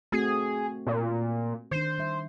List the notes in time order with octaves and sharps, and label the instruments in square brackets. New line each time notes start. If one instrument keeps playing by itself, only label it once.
[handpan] A3 C4 F#4 [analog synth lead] G#4
[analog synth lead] A#2
[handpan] D#3 D4 [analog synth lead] C5
[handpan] G3 E5